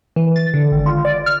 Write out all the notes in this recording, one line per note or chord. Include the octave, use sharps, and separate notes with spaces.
E3
A6
D3
G#1
F4
D5
F6